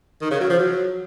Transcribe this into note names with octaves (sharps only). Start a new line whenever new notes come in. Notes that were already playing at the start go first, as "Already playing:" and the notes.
D#3
C#3
F#3
F3
F#3